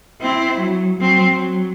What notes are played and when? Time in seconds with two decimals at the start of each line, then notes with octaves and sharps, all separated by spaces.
0.21 C4 E4
0.59 F#3
0.99 F#3 C4
1.31 F#3